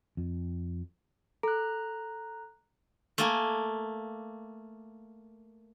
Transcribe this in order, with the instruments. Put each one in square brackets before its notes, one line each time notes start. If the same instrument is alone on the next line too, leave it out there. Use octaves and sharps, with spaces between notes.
[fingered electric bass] F2
[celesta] A4 [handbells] A#5 F#6
[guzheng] A3 A#3 G#5